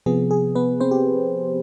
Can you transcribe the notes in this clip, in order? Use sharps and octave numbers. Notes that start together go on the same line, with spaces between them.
C3 F3 B3 G#4
G#4
B3 B4
C4 C5
G4